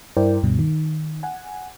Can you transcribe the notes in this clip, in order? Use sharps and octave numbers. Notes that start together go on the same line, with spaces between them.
G2 E4 A#4 C5 D5 G5
D2 G2 B2
D#3
F#5 G#5